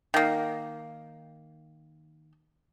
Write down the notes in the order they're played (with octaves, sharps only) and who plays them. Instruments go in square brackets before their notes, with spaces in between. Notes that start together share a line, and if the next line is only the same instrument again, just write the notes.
[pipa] D#3 A#3